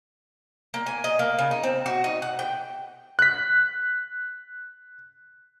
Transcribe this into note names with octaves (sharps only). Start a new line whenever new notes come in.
A#3
G#5
D#5
A#3
C#3
D#4
C4
F#4
D#4
F#5
G5
F#6 B6